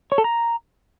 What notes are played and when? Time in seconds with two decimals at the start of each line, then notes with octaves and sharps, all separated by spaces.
0.12 C#5
0.18 A4
0.24 A#5